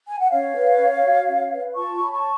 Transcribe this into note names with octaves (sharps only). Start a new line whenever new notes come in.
G#5
F#5
C#4 C#5 F5
B4
C#4
F#4
C#4
B4
F4 A5 C#6
C#5 B5
A5 C#6